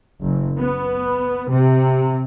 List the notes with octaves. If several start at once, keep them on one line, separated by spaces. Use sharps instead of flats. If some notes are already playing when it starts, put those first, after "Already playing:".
F#1
B3
C3